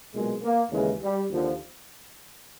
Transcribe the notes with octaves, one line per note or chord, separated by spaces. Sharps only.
B1 A#2 G#3
A#3
D#2 C#3 E3 G#3
G3
D#2 D3 F3